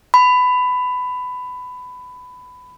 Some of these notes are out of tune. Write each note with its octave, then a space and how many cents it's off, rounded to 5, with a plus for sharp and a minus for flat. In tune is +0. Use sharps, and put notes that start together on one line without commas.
B5 +20